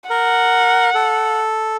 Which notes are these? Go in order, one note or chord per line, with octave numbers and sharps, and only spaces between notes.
A#4 F#5
A4